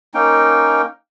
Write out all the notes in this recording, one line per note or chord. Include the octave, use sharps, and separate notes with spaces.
A#3 C#4 D#4 G5